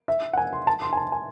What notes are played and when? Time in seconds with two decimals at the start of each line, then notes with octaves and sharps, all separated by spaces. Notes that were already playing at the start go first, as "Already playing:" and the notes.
0.08 E5
0.33 F#5
0.38 G#5
0.53 C6
0.67 A5
0.82 C6
0.93 G#5
0.97 A5
1.12 G#5